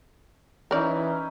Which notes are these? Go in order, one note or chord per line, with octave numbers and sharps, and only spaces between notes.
E3 C#4 D#4 E4 A#4 D5